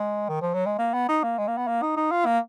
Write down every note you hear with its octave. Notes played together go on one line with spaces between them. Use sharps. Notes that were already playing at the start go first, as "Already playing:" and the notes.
Already playing: G#3
D#3
F3
F#3
G#3
A#3
B3
D#4
A#3
G#3
A#3
B3
A#3
D#4
D#4
F4
A#3